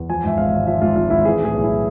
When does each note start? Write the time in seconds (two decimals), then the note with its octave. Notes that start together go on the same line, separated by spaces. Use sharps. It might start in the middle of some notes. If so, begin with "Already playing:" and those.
Already playing: E2
0.09 F3 G#5
0.23 G#2 E5
0.38 G#1 F5
0.53 G#1
0.67 F3 E5
0.81 G#2 F4
0.96 G#1 F4
1.10 G#1 E4
1.25 E3 G#4
1.40 A2
1.45 G#4
1.54 B1
1.64 E4